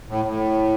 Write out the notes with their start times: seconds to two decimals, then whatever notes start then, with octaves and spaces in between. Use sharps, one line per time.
0.08 A2
0.25 A2